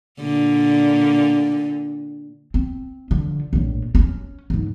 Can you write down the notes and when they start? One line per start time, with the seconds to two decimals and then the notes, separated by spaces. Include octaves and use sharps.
0.20 A#2 D3
2.54 C4
3.11 D3 F3
3.53 A#1 A2
3.95 C4 C#4
4.50 G#2 D3